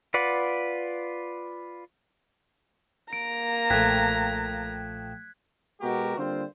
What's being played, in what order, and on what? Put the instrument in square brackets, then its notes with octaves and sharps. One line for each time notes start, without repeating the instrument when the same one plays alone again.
[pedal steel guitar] F4 B4 D5 F#5
[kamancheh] A#3 A#5 [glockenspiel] D7
[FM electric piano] B1 A#2 G5 [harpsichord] F3 A3 [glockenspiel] F#6 G#6 B6
[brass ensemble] B2 G#3 B3 F#4 G4 A#4
D3 G3 A#3 C4 F4 C5